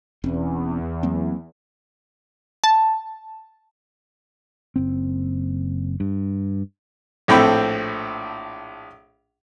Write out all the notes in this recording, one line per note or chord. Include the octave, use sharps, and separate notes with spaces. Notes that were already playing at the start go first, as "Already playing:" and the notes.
E1 E2 C4 C#4
F#3 A#3 C4
A5
F#1 C4
G2
A#1 A2 C4 A4 G5 B5